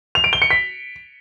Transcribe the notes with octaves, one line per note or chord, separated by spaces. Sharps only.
F7
D7
G7
C#7
B6